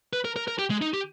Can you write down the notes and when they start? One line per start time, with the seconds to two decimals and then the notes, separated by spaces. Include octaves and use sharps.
0.13 B4
0.25 A#4
0.36 A#4
0.48 A#4
0.59 G4
0.71 G#3
0.82 D#4
0.94 G4